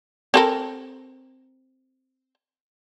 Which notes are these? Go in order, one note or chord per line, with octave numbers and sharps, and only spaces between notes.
C4 A4 A#4